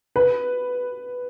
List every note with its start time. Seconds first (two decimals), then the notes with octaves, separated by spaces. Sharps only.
0.16 B4